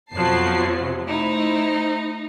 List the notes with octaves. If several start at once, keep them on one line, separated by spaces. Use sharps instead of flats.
F2 B2 F3 F#3 A5 C7
C3
A3 D#4 E4 C5